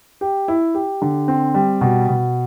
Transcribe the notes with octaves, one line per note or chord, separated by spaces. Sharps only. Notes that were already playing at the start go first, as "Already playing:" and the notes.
G4
E4
G4
D3
C4
G3
B2
B2